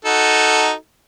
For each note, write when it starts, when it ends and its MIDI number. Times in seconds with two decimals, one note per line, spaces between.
0.05 0.73 63
0.05 0.73 66
0.05 0.73 69